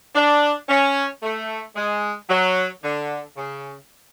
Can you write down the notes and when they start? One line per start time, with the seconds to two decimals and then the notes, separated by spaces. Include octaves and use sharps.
0.15 D4
0.69 C#4
1.23 A3
1.75 G#3
2.29 F#3
2.83 D3
3.37 C#3